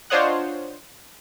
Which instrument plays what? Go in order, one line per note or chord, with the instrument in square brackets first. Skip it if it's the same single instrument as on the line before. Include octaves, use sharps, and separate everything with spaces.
[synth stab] D4 F4 C5 C#5 D#5 F#5